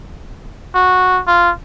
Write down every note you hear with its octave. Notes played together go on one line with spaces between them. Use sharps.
F#4
F4